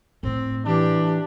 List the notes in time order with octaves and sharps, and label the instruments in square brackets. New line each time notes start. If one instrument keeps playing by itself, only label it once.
[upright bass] A2 A3 [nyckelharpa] C4
[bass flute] E3 [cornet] D4 [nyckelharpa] G4